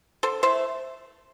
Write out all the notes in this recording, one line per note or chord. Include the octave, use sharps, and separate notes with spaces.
D3 A4 C5
A3 E4 C5 E5